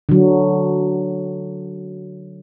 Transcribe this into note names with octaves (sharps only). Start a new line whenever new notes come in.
D3 F#3